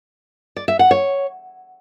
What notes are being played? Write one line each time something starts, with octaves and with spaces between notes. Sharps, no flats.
D5
E5
F#5
C#5